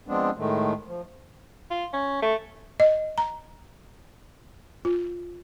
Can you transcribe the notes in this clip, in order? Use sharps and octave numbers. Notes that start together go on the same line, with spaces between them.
F3 G#3 B3 C4 D4
A2 D#3 G#3 A3
F3
F4
C#4
A3
D#5
A#5
F4